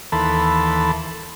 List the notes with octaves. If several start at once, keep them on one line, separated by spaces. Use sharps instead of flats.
D#2 E3 A4 A5 B5 C6